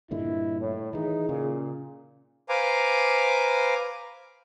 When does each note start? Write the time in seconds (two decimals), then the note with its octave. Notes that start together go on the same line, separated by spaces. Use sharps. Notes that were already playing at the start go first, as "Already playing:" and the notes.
0.11 G2 A#2 D3 E4 D#5
0.61 A2 C#5
0.93 D#3 E3 D#4 G#4
1.29 A#2 C#3
2.49 B4 C5 F5 G#5 A#5 D6